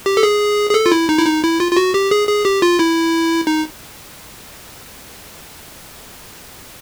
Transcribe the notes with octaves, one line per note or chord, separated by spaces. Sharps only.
G4
A4
G#4
G#4
A4
F4
E4
D#4
E4
D#4
E4
F4
F4
F#4
G4
G#4
G#4
G4
F4
E4
D#4